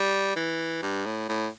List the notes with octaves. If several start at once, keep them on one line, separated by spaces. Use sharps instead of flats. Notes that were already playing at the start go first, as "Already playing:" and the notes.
Already playing: G3
E3
G2
A2
A2